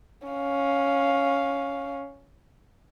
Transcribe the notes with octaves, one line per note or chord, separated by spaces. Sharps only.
C#4 F5